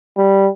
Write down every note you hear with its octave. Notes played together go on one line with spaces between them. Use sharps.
G3